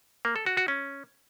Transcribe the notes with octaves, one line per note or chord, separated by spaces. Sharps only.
A#3
A4
F#4
F#4
C#4